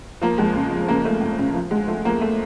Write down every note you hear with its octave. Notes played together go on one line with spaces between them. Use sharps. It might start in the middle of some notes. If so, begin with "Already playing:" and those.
F3 A#3
F2 G#3
C#3
F1
C#3 A#3
F3 A3
F2
C#3
F3
D2 G#3
F3 A3
F3 A#3
A3